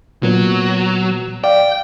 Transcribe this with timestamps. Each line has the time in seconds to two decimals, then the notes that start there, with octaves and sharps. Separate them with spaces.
0.23 A#2 F#3 B3
1.44 D5 F5 G5